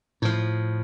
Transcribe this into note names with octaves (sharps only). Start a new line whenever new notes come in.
A2 F3